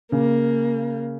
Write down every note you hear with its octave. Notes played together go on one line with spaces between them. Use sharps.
C#3 A#3